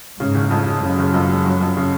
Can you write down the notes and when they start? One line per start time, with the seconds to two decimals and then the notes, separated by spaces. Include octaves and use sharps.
0.19 G#2 C#3
0.35 F#1
0.51 F2
0.67 G#3
0.82 F#2 C#3
0.98 F#1
1.14 F2
1.29 G#3
1.46 F#3
1.61 F2
1.76 C#3